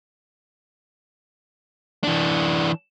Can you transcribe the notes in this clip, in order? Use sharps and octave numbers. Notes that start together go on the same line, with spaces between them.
E3 D4